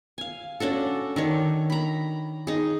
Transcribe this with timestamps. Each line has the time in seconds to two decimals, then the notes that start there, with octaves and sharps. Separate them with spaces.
0.18 F5 G#5
0.60 C#4 D4 F#4 A4
1.16 D#3 D4 C#5
1.70 A#5 B5
2.47 D#4 G#4